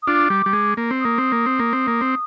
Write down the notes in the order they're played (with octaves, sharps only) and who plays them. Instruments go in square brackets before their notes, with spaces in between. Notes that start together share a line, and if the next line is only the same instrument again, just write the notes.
[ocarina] D#6
[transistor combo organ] D4 F4 [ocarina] D6
[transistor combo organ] G3
G3
G#3
A#3
C4
[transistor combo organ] A#3 [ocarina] D#6
[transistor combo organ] C4
A#3
C4
A#3
C4
A#3
C4